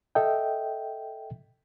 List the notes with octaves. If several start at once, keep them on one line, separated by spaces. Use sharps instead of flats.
A4 D#5 E5 G5